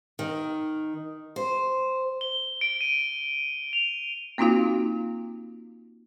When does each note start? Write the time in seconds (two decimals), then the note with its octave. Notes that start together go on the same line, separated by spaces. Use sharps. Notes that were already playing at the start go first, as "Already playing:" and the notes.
0.19 D#3
1.36 C5
2.21 G7
2.61 D7
2.81 D#7
3.73 F7
4.38 A#3 C4 D#4 F4 F#4 F5